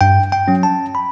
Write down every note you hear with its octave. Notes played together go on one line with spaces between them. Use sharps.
G2 G5
G5
F#3 C#4
A5
B5